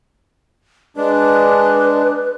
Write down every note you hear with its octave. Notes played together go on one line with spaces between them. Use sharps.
G#3 D4 B4